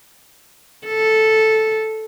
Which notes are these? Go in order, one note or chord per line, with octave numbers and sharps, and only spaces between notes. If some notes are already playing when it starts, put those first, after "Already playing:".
A4